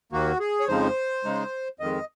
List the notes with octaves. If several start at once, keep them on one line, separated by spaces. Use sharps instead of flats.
D#2 D#3 A#3 F#4
G#4
C#5
F2 C#3 F3 G#3 D#4 C5
C#3 G#3 D#4
F2 D#3 G#3 D#5